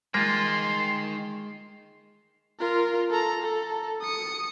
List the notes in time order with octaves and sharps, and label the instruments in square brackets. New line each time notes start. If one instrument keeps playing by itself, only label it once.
[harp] G#3 [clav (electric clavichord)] A#3 F4 [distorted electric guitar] D#4 G5 [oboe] C6
[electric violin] F4 A#4
A4 A#5
A4
D#6 C#7